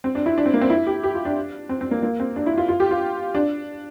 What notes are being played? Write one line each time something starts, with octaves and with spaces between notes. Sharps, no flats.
C4
D4
E4
D4
C4
A#3
C4
E4
G4
G4
F4
D4
C4
C4
A#3
A#3
C4
D4
E4
F4
F4
G4
F4
D4